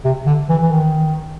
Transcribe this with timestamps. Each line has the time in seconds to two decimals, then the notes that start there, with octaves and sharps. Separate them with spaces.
0.05 C3
0.26 D3
0.49 E3
0.62 E3
0.72 D#3